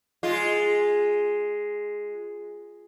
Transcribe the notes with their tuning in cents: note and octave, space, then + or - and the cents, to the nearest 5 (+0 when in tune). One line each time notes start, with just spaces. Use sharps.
G#3 +0 F4 +0